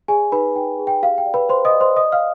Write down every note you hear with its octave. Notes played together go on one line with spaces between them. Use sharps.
G#4 D5 G#5
D#4 B4 B5
D#4 G5
G#4
G5
G4 F5
G5
D5
B4 B5
G4 C5 C6
D#5 D#6
D5
C5 C6
D5 D#5 D#6
F5 F6